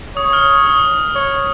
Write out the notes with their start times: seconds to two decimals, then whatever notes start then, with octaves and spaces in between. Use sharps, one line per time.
0.16 C#5 D#6
0.33 F6
0.41 D#6
0.66 D#6
1.15 C#5